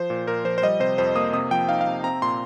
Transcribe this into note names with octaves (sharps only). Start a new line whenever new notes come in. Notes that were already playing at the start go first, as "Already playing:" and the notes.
Already playing: F3 C5
A#2
A#2 A#4
F3 C5
C5
G3 D#5
C3 C5
F2 C5
A#3 D#6
C3 D#6
F3 G5
D#4 F5
F5
C3
C4 A#5
A#2 C6